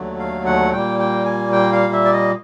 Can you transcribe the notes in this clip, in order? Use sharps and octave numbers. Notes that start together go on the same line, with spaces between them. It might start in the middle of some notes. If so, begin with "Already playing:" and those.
Already playing: D#2 D3 F#3 A3
F5
F#5
A#2 G3 A#3 G5
G5
G#5
G5
F5
E5
D5
D#5